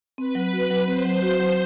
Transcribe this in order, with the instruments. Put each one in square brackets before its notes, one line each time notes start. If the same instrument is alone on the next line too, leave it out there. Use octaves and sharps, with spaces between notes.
[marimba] C4 [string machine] B4
[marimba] F#3
F#4
F#3
[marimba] C4 [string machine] C5
[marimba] F#3
F#4
F#3